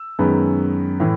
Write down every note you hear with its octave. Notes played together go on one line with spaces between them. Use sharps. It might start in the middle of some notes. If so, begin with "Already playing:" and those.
Already playing: E6
F#2 D#3 G#3 B3
A2 E3